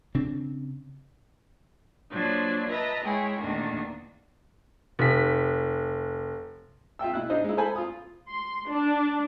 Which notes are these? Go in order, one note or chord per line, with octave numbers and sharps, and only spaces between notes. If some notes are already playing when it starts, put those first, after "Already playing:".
C#3 C4 D4
F3 F#3 A#3 D4 C5 G#6
B4 D#5 E5 A5 A#5
G#3 E4 G#4 C#5 G5
E2 A#2 D#3 A3 A#3 D4
F1 B6
F4 E5 G5 E6
B2 E4 F#6
D4 D#4 C5 D#5
G#3 E4
A4 C5 G#5 B5
F4 D#6
C6
D4